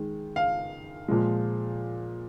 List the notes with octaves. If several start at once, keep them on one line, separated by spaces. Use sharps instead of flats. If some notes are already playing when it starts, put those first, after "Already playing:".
Already playing: D#3 G#3
F5
A#2 F3 G#3